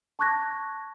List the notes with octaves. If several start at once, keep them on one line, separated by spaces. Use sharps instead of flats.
A5 C#6 D6 F#6 G#6 A#6